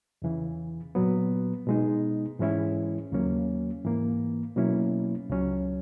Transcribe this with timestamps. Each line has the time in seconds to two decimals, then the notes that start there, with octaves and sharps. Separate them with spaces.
0.22 E2 C#3 E3
0.95 A#2 F#3 B3
1.67 B2 G#3 D#4
2.39 G#2 E3 G#3 C#4 E4
3.12 D#2 C#3 F#3 A#3 C#4
3.84 G#2 E3 A#3
4.56 B2 F#3 A#3 C#4 E4
5.29 C#2 C#3 F#3 C#4